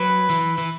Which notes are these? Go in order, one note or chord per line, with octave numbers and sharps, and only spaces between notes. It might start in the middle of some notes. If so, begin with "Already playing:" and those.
Already playing: F#3 B4
E3
E3